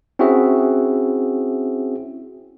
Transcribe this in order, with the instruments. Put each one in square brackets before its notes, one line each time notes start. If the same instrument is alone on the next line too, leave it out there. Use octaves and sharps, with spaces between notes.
[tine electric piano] C4 C#4 E4 F#4 G#4 E5